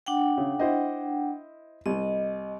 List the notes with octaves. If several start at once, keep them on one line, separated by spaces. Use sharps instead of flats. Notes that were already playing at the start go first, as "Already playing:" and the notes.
D4 F#5 G5
C#3
E4 C5 D#5
C2 D#5